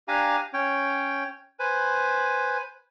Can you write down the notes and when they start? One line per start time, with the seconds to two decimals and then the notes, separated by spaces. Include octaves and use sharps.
0.08 D4 G4 F5 G#5 A#5
0.54 C#4 C#5 G5
1.59 B4 C5 G#5